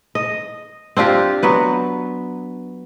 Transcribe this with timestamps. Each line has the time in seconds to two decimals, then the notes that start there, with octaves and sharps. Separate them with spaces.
0.15 D#5
0.97 C4 D4 F4 G4
1.43 F#3 B3 B4